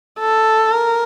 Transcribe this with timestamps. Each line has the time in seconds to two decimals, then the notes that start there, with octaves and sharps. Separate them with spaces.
0.19 A4
0.71 A#4